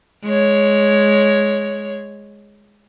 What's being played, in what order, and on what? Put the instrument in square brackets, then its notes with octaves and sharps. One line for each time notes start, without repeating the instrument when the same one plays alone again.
[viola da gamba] G#3 C#5